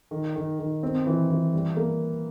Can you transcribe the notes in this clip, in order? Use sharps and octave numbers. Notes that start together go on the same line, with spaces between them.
D#3
D#3
D#3
C4
E3
E3
G3
A#3